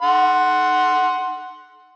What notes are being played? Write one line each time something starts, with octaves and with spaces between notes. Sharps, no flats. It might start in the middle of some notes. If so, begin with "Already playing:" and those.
F#5 C6